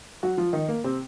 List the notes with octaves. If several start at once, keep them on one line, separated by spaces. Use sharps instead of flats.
F#3 F#4
F3 F4
D#3 D#4
A#3
C3 C4